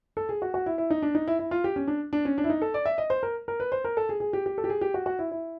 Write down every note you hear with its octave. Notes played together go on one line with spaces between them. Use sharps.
A4
G#4
F#4
F#4
E4
E4
D#4
D4
D#4
E4
E4
F4
G4
C#4
D4
D4
C#4
D4
E4
D#4
A4
D5
E5
D#5
C5
A#4
A#4
B4
C5
A#4
A4
G#4
G#4
G4
G4
A4
G4
G#4
G4
F#4
F#4
E4
E4